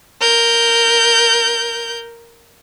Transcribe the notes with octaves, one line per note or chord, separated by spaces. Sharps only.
A#4 G6